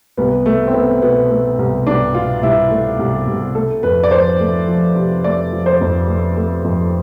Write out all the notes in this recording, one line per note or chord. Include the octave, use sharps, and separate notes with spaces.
C2 B3
A3
C4
A3 B3
B2 B3
A3
C2
C2 D4
B2 F4
C2 E4
A3
C2
C2
A3 A4
F2 B4
D5
F3 C5
A3
F3
C3
A3 D5
F3
C5
F2
A3
A3
F2